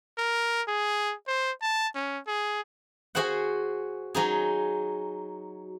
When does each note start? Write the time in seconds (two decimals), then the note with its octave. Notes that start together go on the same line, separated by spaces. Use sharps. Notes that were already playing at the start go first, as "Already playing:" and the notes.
0.18 A#4
0.68 G#4
1.28 C5
1.62 A5
1.95 C#4
2.27 G#4
3.15 F#4 G#4 C5 F#5
4.15 F#3 D#4 G#4